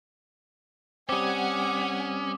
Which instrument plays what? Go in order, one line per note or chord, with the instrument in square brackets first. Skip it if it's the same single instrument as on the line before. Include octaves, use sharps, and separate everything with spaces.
[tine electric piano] G3 C4 [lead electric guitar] C#4 [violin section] F#5 G#5 [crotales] D6 D#6